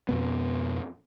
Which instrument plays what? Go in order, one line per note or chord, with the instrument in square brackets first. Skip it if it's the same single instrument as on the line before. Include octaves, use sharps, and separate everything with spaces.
[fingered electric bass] F2 B2 B3